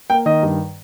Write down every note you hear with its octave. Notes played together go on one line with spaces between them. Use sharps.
A#3 G5
D#3 D#5
G2